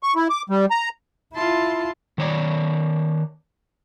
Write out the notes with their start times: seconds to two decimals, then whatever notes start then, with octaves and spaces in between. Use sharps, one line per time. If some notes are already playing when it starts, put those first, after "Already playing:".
0.03 C#6
0.16 E4
0.30 D6
0.50 G3
0.71 A#5
1.34 E4 F4 A5 C6
2.18 D#3 C#5 D5